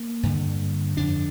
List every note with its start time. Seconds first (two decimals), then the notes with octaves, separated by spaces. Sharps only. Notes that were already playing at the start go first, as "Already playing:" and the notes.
Already playing: A#3
0.23 G2 D3
0.97 F2 D3 D4